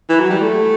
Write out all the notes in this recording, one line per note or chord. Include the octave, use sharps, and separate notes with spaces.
E3
F#3
G3
A3